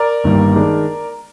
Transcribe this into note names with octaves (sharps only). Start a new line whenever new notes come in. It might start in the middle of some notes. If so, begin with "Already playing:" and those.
Already playing: A#4 D5
G1 G2 D#3 G3 A#3
D#3 G#3 D4